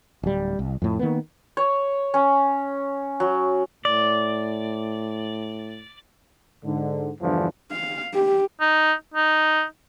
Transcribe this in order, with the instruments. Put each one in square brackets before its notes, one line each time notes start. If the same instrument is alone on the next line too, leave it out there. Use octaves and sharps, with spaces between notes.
[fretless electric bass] D1 G3
C2
F2 A2
D#3 A#3 B3
[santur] C#5
C#4
F#3
[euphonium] A2 [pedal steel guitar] D5
[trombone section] G#2 D3
E2 G2 D3 E3 F3
[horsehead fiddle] F5
G4
[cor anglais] D#4
D#4